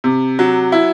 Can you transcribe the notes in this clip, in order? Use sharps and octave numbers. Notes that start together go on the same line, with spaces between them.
C3
F#3
E4